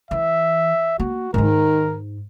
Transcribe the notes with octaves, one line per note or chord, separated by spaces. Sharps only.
E3 E5
A#3 F#4
G#2 D#3 D#4 A#4